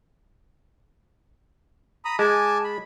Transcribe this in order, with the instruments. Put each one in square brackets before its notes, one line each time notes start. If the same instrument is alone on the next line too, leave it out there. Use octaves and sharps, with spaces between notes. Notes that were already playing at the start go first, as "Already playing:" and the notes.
[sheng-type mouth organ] A#5 B5 D#6
[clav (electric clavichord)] G#3 [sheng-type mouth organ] G#5 A5 D6
[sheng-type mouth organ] B5